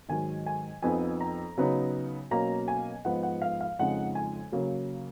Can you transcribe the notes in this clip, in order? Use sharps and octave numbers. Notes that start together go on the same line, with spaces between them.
G#2 D#3 F#3 G#5
G#5
F2 F3 B3 D#4 G#5
A#5
C#3 F#3 B3 D#4
B2 F#3 A#3 C#4 A#5
G#5
G#2 F3 B3 F#5
F#5
F5
F5
F2 C#3 F3 G#3 D#4 F#5
G#5
C#3 F#3 A#3